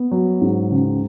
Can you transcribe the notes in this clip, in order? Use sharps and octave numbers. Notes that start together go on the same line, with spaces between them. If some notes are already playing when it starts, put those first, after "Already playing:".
Already playing: B3
F#3
G#2
C#2